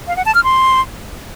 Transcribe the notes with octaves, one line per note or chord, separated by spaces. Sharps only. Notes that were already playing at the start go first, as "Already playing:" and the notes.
F5
F#5
A5
F6
C6